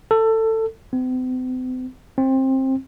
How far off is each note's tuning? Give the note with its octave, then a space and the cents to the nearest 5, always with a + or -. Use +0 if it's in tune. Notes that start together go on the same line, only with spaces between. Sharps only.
A4 +20
C4 -45
C4 +20